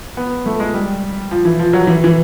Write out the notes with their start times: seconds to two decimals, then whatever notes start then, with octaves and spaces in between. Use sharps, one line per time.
0.17 B3
0.46 A3
0.60 G#3
0.74 G3
1.31 F3
1.45 E3
1.59 F3
1.73 F#3
1.87 E3
2.04 E3